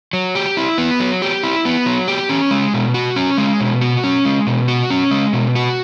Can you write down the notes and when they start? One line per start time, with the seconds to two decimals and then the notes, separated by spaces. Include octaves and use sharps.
0.13 F#3
0.35 G4
0.57 E4
0.78 B3
1.00 F#3
1.22 G4
1.43 E4
1.65 B3
1.86 F#3
2.08 G4
2.29 C#4
2.51 G#3
2.74 B2
2.94 F#4
3.16 C#4
3.38 G#3
3.60 B2
3.81 F#4
4.04 C#4
4.25 G#3
4.47 B2
4.68 F#4
4.90 C#4
5.11 G#3
5.33 B2
5.55 F#4